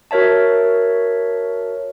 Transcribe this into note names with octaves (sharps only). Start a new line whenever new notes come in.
F#4 A#4 C#5 E5 A5